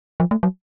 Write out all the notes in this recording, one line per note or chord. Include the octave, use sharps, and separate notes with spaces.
F3
A3
F#3